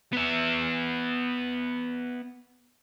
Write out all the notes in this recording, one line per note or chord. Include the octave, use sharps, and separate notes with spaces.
B3 E5